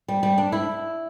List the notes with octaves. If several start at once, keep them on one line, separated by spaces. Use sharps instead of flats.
G3
G3
D4
E4